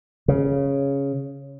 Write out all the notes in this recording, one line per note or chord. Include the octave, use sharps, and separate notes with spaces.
C#3